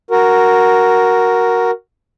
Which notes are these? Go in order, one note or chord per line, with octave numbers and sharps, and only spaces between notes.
F#4 A#4